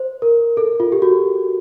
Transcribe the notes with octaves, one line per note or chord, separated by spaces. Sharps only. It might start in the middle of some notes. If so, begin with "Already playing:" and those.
Already playing: C5
A#4
A4
F4
G4
F#4